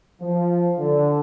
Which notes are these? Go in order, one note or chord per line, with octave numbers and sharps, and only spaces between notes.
F3
D3